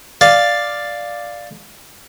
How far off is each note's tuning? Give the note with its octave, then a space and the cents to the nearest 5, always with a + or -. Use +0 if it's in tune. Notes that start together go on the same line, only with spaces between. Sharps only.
D5 +5 F5 +0